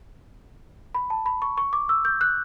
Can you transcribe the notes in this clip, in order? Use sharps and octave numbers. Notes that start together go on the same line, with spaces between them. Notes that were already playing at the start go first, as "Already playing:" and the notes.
B5
A5
B5
C#6
C#6
D6
E6
G6
F#6